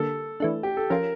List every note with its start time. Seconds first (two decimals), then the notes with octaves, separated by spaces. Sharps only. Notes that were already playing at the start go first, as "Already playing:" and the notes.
Already playing: D3 G3 A#3 A4
0.40 E3 A3 D4
0.63 G4
0.77 A4
0.90 F3 C#4 F4 A#4